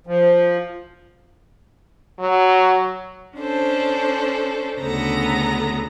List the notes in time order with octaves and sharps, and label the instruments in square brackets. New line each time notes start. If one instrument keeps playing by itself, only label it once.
[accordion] F3
[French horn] F#3
[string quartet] C#4 D4 A4 C5
D2 C#3 B3 A4 A#5 A#6